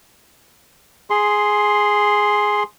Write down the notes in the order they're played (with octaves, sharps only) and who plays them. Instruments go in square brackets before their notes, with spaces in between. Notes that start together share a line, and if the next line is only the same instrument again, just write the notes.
[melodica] G#4 C6